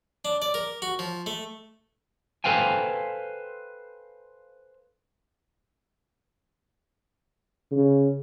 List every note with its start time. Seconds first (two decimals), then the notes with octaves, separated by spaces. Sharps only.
0.25 D4
0.42 D5
0.54 A#4
0.82 F#4
0.99 F3
1.26 A3
2.44 A4 B4 C5 F5 G5 G#5
7.72 C#3